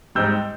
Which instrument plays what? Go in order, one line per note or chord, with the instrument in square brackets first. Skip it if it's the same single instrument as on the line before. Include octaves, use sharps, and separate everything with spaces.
[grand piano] G#2 G3 E6 G6